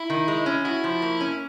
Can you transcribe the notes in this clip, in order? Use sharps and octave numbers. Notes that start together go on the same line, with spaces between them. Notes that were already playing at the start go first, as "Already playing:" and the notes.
Already playing: E4
D#3
G#3
C#4
E4 F#4
F3
A#3
C#4